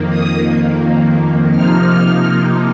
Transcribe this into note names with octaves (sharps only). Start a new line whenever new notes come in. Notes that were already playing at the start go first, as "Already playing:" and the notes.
Already playing: F2 D#3 A#3
D#6
C3 F3 A#3 D#4 F6